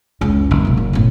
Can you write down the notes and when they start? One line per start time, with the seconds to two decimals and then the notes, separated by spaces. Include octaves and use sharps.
0.21 F#1 C#2
0.51 F#1 D#4
0.65 D1 B2
0.77 F#2
0.93 B1 A2